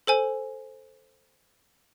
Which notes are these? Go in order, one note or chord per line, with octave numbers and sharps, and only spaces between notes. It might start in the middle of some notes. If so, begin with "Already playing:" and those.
A4 C5 G#5